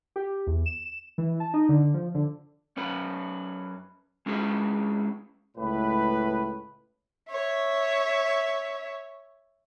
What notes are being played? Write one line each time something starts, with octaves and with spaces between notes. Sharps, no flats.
G4
E2
E7
E3
A5
D#4
D3
F3
D3
F#2 C#4 B4
G#3 C#4 E4 G#4 B4
C#2 A2 B4
C#5 E5